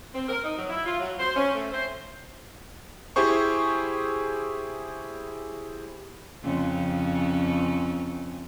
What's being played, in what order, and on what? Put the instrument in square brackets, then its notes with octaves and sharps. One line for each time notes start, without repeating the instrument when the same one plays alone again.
[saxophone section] C4
A#4
D#4
F#3
E4
F4
F#3
C5
C#4
A3
C5
[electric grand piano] E4 G4 G#4 C5 C#6
[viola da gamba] F2 C#3 C#4